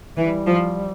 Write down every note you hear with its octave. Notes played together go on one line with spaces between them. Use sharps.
E3 G3
F3